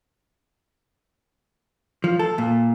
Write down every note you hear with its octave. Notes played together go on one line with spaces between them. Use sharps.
F3
A4
A#2